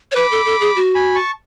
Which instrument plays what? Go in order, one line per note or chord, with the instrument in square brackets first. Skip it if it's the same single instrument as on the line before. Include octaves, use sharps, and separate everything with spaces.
[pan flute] C#5
[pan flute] B4 [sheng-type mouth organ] B5 D6
[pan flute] A4
A4
G#4
F#4
[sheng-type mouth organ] G#5 B5
A5 C#6